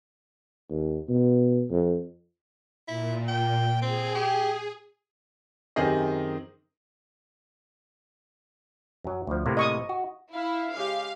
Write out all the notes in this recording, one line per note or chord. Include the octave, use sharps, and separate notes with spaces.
D#2
B2
F2
A#2 E4
G5
C4 G#4
G4
F#2 D#3 C4 G4 G#4 D#5
F#2 F#3
D2 F3
A2 C3 A#3
D#5 C#6 D#6
F#4
E4 F5
C#3 G#3 G4 F5